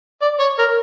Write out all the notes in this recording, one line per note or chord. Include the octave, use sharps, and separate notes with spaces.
D5
C#5
A#4